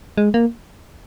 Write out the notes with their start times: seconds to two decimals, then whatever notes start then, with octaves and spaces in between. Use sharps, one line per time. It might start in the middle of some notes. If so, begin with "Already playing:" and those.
0.17 G#3
0.34 A#3